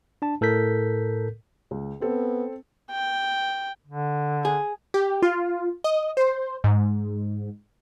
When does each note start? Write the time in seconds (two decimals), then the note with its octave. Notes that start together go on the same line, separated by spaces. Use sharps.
0.22 D4 A5
0.41 A2 A4 A#4 G6 B6
1.71 C#2
2.01 B3 C4 A4
2.91 G5
3.87 D3
4.45 G#4
4.94 G4
5.22 F4
5.84 D#5
6.17 C5
6.64 G#2